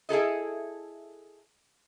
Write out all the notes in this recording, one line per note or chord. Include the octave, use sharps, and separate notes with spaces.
E4 G#4 A4 D#5